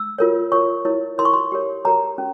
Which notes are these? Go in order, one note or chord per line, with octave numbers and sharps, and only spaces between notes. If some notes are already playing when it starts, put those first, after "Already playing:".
Already playing: E6
F4 A#4 C#5
F4 A#4 C#5 C#6
E4 A#4 C#5
E4 A#4 C#5 C6
C#6
C6
G4 A#4 C#5
G4 A#4 C#5 A#5
C#4